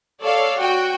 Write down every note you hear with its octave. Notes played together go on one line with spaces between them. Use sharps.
A4 C#5 D5 F5
F#4 G5